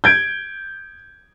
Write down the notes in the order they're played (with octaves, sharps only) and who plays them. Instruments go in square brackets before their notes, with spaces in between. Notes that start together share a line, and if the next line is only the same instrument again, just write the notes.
[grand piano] G6 G#6 D7